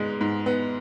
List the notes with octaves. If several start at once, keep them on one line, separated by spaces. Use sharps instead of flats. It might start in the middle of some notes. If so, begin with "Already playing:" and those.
Already playing: G#2 G#3 B3
G#2
B3